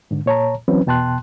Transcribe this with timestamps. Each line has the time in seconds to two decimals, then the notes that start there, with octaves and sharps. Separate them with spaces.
0.11 G#2 D3
0.26 A#2 C#5 A5 A#5
0.68 E3 F#3 C4 C#4 B4
0.86 E2 B2 G5 A5 C6 F#6